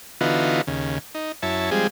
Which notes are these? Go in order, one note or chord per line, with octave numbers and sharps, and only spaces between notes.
D3 E3 B3 D#4 F4 F#4
D#2 C#3
D#4
F#2 E4 C#5 A5
F3 G3 G#3 C4 G#4